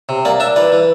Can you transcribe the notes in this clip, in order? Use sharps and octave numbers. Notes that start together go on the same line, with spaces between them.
C3
A#3 D5
D4 E5
E3 D5
E3